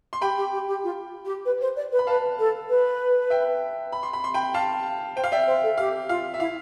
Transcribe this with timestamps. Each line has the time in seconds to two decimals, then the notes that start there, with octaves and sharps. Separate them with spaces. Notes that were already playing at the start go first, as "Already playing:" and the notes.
0.13 C6
0.21 G4 G5 B5
0.37 G4
0.53 G4
0.68 G4
0.83 F4
1.25 G4
1.45 B4
1.61 C5
1.76 D5
1.92 B4
1.99 B5
2.07 B4 F5 A5
2.39 A4
2.69 B4
3.30 E5 G5
3.92 B5
4.03 C6
4.13 B5
4.24 C6
4.34 G5 B5
4.54 F5 A5
5.16 C5 G5
5.24 F5
5.31 D5 E5 G5
5.47 C5
5.63 A4
5.78 G4 F5
6.09 F4 F5
6.34 E5
6.40 E4 F5